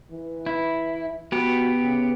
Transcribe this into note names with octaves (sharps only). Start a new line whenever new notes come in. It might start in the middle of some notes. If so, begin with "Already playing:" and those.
E3
E4
B3 F#4 G4
C#3